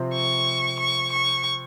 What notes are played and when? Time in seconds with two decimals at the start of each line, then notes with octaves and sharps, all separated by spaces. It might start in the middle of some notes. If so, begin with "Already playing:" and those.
Already playing: C3 F3 C4
0.14 C#6
0.80 C#6
1.13 C#6